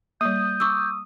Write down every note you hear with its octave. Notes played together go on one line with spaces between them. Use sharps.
G3 A#3 D#6 G6
C#6 D6 E6